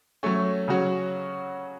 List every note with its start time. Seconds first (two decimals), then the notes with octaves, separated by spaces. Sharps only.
0.23 F#3 A3 C#4
0.68 C#3 F#3 C#4 F#4